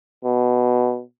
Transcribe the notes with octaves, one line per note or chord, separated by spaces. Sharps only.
B2